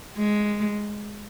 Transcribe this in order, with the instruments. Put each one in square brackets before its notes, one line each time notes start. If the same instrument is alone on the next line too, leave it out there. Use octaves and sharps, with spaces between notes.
[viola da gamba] G#3